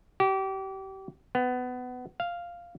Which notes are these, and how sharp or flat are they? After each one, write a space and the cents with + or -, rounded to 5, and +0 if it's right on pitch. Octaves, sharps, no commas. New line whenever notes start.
G4 -30
B3 +20
F5 -5